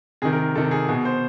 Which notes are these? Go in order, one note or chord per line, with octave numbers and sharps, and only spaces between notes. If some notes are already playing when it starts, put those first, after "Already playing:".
C3 D#3 G#4
A#4
C3 D#3 A4
G#4
B2 G#4
C5